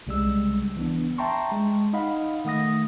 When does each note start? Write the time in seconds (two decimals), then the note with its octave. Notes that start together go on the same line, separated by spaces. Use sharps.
0.07 C2 C#3 G3 G#3 E6
0.77 E3 B3 D4
1.18 E5 G5 A5 A#5 C6 C#6
1.52 G#3
1.93 D#4 D#5 F5 F#5 B5
2.45 D#3 A3 F#5 D#6 A#6